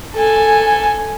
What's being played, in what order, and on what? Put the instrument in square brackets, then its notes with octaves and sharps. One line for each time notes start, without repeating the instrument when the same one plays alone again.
[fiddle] A4 G#5